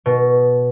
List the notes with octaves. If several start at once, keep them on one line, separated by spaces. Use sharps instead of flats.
B2